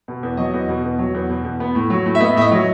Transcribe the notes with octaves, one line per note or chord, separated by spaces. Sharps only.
B2
E2
F#3 D#5
E2
B2
E2
F#3
E2
B2
E2
B3
A2
F#3
A2
E5
B3 D#5
A2 E5
D#5
F#3